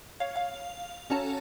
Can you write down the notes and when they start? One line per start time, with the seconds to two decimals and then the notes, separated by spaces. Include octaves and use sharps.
0.20 C#5 F5
0.36 F5
1.10 C#4 F#4 A4 C#5 A5 A#5